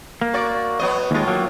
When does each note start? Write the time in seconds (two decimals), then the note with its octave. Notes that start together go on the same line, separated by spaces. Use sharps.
0.21 A#3
0.33 F#4 D5
0.79 F#3 B3 D#5
1.11 D#2 A2 G#3 F4
1.28 F#3 A#3